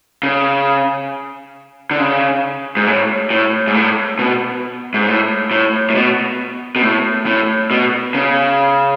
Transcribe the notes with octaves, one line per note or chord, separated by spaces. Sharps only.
C#3
D3
C#3
G#2
A2
A2
G#2
A2
B2
G#2
A2
A2
A2
B2
B2
A2
A2
B2
C#3